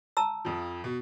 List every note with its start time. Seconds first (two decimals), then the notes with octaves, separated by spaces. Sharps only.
0.17 A5 A#5 E6
0.45 F2 F3
0.84 B2